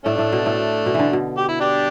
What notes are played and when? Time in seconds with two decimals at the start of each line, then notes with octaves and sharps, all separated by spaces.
0.05 A2 A3 D4
0.18 A2
0.33 B2
0.46 A2
0.86 B2
0.95 D3 E3
1.13 B2
1.38 G4
1.49 E4
1.61 D4 G4